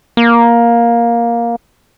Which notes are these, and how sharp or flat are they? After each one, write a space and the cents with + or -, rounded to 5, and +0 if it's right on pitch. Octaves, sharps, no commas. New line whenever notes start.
A#3 +10